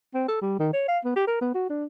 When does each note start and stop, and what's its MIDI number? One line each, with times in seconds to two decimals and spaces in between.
0.14 0.24 60
0.28 0.37 69
0.42 0.55 55
0.59 0.71 51
0.73 0.87 73
0.88 0.99 77
1.05 1.13 59
1.16 1.26 67
1.27 1.39 70
1.41 1.54 59
1.54 1.66 66
1.69 1.85 62